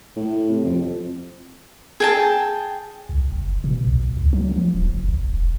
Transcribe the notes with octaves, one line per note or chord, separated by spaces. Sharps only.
A2
C3
F2
G#4 G5 A5
C2
F#1
B2
B1
C#2
F#3
F3
D1
F#1
A#1
E1